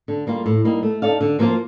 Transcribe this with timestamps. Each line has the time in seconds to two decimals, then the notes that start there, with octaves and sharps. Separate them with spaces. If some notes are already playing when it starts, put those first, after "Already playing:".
0.08 D3
0.27 G3 A#3 F4
0.46 A2
0.65 G3 A#3 D#4
0.83 A3
1.02 D#4 A4 D5 F5
1.21 D3
1.39 F3 A#3 F4 C5